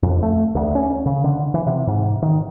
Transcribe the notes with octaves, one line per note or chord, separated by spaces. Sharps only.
F2
A3
D2
C#4
C#3
D3
E3
C3
G#2
D#3